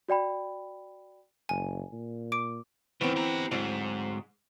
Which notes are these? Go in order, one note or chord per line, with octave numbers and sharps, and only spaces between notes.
F#4 D5 G5 B5
F#1 G#5
A#2
D6 D7
F#2 D#3 E3 B3 C4
G4 A#5
D2 G#2 F#3 C4